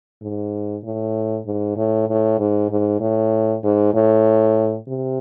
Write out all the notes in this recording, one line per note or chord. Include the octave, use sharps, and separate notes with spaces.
G#2
A2
G#2
A2
A2
G#2
G#2
A2
G#2
A2
C3